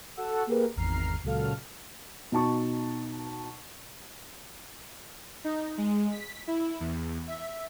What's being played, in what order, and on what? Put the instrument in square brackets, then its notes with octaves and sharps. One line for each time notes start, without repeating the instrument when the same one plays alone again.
[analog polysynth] F#4 A4 F#5 E6
A#3 G4 G#4 A#4 B4
G#1 E2 A#5 F6 C7
C#2 A#2 F#3 A4 F5 F6
[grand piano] B2 D#4 A5 C#6
[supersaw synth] D#4
G#3
B6
E4
E2
E5